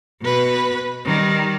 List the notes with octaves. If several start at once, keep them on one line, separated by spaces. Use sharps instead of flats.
B2 B4
D#3 G3